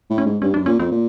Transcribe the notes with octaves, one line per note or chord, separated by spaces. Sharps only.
A2
C#4
G#2
G2 C#4
F#2 D4
A#2 C#4
F2 C4
A#2